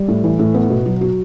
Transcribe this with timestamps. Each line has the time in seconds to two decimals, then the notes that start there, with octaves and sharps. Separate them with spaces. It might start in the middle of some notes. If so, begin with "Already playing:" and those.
Already playing: G3
0.08 A2
0.24 E3
0.39 A2
0.54 B3
0.70 B2
0.86 F#3
1.01 F#4